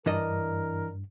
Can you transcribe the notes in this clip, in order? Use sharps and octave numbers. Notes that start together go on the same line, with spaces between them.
G2 E3 D4 A#4 D#5